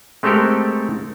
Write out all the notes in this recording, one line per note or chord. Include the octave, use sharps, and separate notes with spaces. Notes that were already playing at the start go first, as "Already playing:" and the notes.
G#3 A3 C4 G4 A4 A#4